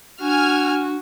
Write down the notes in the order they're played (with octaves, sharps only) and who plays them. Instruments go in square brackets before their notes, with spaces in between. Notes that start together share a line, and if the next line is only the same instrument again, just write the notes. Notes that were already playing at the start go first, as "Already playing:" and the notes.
[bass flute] D4 [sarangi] F#4 [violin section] G#5 F6